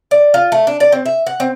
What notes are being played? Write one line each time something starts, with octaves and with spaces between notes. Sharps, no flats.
D5
F4
A3
D4
D5
C4
E5
F#5
C4